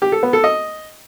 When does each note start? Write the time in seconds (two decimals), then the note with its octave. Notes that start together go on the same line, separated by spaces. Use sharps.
0.02 G4
0.12 A4
0.23 B3
0.33 A4
0.44 D#5